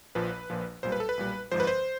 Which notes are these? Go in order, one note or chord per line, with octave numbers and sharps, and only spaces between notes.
A#1 A#2 F3 B4
A#1 A#2 F3
B1 A#2 G3 C5
B4
A4
B4
B1 A#2 G3
G#1 G#2 F3 C5
B4
C5